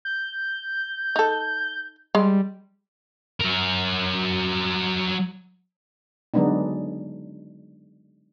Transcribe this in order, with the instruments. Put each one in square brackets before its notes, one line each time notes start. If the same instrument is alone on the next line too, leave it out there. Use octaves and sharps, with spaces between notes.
[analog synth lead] G6
[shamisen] D#4 A4
[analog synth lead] G3 [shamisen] G#3
[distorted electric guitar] F#3 A#4
[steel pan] D3 F#3 G#3 B3 D4 D#4